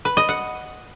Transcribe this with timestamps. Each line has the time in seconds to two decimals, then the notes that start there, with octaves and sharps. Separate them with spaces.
0.05 B4
0.17 D#5
0.29 F#5